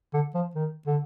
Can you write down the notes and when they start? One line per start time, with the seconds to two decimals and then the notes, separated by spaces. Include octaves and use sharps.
0.14 D3
0.35 F3
0.55 D#3
0.87 D3